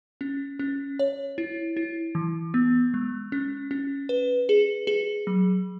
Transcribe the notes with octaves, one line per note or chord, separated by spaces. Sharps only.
C#4
C#4
C#5
E4
E4
E3
B3
G#3
C#4
C#4
B4
G#4
G#4
F#3